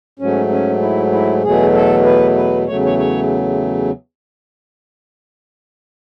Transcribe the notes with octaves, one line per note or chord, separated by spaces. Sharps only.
G#2 F#3 A3 C#4
C#4
E4
E4
E2 B2 F#3 A3 G#4
A4
B4
B4
E2 C#3 F#3 A3 C#5
C#5
C#5